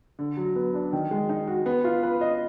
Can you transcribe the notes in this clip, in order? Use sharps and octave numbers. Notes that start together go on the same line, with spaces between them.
D3
F#3
B3
D4
D#3
G#3
D#4
F#4
B3
F4
B4
D#5